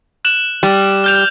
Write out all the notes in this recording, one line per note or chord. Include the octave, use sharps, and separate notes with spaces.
F#6 E7 F#7
G3
F6 G6 F7